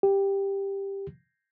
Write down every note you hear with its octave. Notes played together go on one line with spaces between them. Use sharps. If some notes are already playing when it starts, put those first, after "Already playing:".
G4